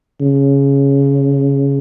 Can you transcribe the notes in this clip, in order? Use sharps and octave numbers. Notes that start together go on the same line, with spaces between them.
C#3